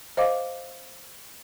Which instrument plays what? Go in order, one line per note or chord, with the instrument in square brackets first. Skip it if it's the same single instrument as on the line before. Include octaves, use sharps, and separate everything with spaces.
[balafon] C5 D#5 F5 D6